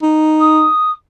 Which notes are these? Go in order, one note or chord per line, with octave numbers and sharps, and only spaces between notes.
D#4
D#6